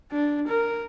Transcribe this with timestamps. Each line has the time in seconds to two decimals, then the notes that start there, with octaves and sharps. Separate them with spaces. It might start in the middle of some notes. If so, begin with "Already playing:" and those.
0.11 D4
0.47 A#4